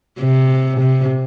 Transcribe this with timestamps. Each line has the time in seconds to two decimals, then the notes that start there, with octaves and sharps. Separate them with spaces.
0.20 C3
0.80 C3